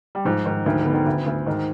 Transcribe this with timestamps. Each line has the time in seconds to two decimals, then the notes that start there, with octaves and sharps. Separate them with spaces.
0.15 G3
0.25 G#2 F3
0.45 G#2 D#3
0.66 D2 D#3
0.80 D3
0.86 B3
0.93 D#3
1.06 D2
1.26 D2
1.46 G#2 D#3